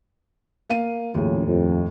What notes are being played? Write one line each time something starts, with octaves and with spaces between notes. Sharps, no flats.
A#3 F5 D#7
D#2 A2 C#3 F3 C#4
F2